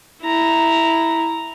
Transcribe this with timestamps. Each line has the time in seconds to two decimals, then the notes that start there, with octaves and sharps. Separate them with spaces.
0.24 E4 A#5